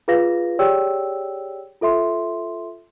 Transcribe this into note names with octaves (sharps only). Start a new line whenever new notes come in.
F4 G#4 B4 F5 A#6
G4 G#4 C#5 D5 G5 E6
F4 A4 E5 C6